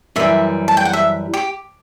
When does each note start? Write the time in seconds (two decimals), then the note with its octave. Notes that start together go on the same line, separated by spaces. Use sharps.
0.16 F#2 E3 G3 E5
0.68 A5
0.77 G5
0.85 F#5
0.93 E5
1.34 G4